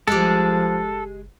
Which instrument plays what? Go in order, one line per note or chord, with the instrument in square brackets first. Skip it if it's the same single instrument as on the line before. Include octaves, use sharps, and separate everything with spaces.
[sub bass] F#1 [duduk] F3 [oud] G#3 G4 [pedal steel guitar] A4